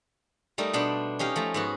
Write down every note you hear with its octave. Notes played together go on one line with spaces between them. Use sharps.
G3 A3 D#4 A#4
B2 B3 D4 C5
C#4 D#4 G4 F5
F3 A3 A#5
G#2 B3 F#4